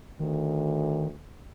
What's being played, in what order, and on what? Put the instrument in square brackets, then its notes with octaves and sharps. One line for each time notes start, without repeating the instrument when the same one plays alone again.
[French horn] D2 [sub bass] D#3